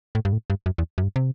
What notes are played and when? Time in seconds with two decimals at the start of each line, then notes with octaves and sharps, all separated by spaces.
0.15 A2
0.25 G2
0.33 A2
0.50 G2
0.66 F#2
0.78 E2
0.98 F#2
1.03 G2
1.16 C3